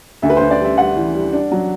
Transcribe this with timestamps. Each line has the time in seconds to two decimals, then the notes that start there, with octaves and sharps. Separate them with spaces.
0.22 D2 E5
0.30 B4
0.37 D2 C5
0.50 D5
0.60 G3 E5
0.78 G3 F#5
0.96 E3
1.14 G3
1.33 D4
1.52 F#3